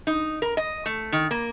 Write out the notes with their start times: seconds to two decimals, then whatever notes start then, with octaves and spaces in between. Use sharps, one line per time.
0.07 D#4
0.42 A#4
0.57 D#5
0.86 A3
1.12 D#3
1.31 A#3